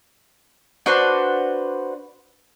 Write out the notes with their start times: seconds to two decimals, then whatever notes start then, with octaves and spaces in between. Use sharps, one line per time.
0.86 D4 F#4 B4 C5